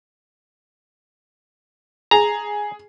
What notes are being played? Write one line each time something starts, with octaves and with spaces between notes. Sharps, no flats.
G#4 A#5